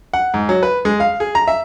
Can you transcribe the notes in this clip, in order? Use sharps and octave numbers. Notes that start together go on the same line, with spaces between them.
F#5
G#2
F#3
B4
G#3
F5
G#4
A#5
E5